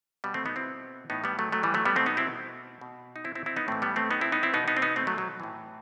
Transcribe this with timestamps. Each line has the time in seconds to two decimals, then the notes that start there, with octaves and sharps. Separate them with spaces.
0.24 B2 G3 B3
0.34 A3 C4
0.45 B3 D#4
0.56 C4 E4
1.10 A2 E3 B3 D#4
1.24 G3 B3
1.39 F#3 A3
1.52 F#3 A3
1.63 E3 G3
1.74 F#3 A3
1.85 G3 B3
1.96 B2 A3 C4
2.06 B3 D#4
2.17 C4 E4
2.81 B2
3.16 D#4
3.25 C4 E4
3.35 C4 E4
3.46 C4 E4
3.56 B3 D#4
3.68 A2 E3 A3 C4
3.82 G3 B3
3.96 A3 C4
4.10 B3 D#4
4.21 C4 E4
4.32 B3 D#4
4.43 C4 E4
4.54 B2 B3 D#4
4.68 B3 D#4
4.77 C4
4.82 B3 D#4
4.96 A3 C4
5.07 F#3 A3
5.18 F#3
5.40 A2 E3